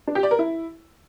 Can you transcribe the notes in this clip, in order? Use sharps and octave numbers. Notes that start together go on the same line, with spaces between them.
D4
G4
D5
A#4
E4